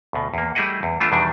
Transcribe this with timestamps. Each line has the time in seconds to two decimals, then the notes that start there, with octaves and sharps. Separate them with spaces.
0.13 D2 B2
0.34 E2 A#3
0.55 G3 A3 E4 G#4 D#5 F#5
0.83 E2
1.00 E3 A3 B3 D4 F4 E5
1.12 E2 B2 D#3 G3 D4